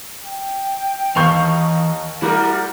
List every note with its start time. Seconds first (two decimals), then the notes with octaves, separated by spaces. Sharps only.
0.24 G5
1.16 D#2 E3 D#4 F5 C#6 G6
2.22 G3 A3 E4 F#4 A#4